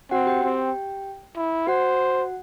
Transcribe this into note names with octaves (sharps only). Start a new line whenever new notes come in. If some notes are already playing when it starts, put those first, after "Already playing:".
C4 F#4 F#5
G4 G5
C4
E4
F#4 C5 F#5